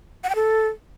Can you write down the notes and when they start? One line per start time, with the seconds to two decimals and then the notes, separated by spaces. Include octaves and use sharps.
0.24 F#5
0.29 G5
0.35 A4